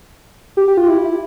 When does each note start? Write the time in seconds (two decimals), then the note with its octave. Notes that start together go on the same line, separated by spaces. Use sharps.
0.57 G4
0.68 G4
0.77 F4
0.88 E4
1.04 E4